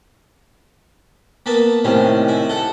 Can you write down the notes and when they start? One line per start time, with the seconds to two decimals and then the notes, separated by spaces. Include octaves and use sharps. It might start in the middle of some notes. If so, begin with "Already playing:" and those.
1.46 A#3 B3 A5
1.84 A2 C3 D#3 C#4
2.28 E4
2.49 A4 F#5